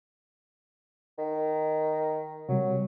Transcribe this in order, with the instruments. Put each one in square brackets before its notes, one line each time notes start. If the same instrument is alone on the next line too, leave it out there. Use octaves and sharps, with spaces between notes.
[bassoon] D#3
[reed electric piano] C3 G3 [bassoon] F#3